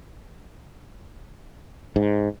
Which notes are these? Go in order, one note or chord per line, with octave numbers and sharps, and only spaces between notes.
G#2